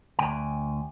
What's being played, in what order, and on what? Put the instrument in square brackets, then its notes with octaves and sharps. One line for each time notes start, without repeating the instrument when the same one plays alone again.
[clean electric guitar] D2 G5 G#5